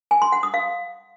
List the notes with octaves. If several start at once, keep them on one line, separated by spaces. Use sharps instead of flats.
G#5
C6
F#5
D#6
F5